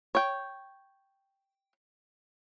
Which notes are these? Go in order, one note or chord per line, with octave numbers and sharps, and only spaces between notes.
C#5 G5